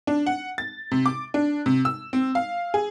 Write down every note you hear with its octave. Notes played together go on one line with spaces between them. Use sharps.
D4
F#5
A6
C3
D6
D4
C3
E6
C4
F5
G#4